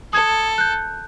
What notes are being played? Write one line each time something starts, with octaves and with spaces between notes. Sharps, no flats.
A4 D#6 G#6
F#6 G6